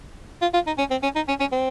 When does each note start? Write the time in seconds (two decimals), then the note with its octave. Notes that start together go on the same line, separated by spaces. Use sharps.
0.42 F4
0.54 F4
0.67 D#4
0.78 C#4
0.91 C4
1.03 C#4
1.16 D#4
1.28 C#4
1.40 C#4
1.52 C4